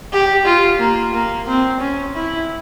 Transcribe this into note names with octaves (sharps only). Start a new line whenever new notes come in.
G4
F4
A#3
A#3
C4
C#4
E4